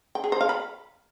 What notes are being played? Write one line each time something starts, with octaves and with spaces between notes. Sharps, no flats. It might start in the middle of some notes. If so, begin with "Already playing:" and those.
G5
G#4
C5
F5
B5